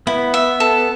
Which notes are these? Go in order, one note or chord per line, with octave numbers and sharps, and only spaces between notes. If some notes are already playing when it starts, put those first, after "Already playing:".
B3 E4
E5
A4